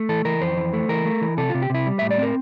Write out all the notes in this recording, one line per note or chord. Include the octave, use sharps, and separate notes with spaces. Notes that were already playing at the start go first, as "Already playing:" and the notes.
Already playing: A3
E3 A4
E3 A#4
F2 C5
E3
A3
E3 A#4
A3
E3
C3 A4
C3 F4
G4
C3 E4
G3
A2 E5
D5
C4 A#4